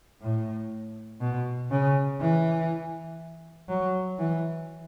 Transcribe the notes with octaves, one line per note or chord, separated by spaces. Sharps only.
A2
B2
C#3
E3
F#3
E3